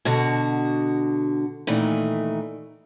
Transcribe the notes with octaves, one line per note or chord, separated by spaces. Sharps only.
B2 D3 F#4
A#2 D#3 E3 A3